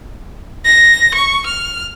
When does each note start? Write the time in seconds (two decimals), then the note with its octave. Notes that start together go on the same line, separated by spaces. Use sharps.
0.66 A#6
1.15 C#6
1.46 F6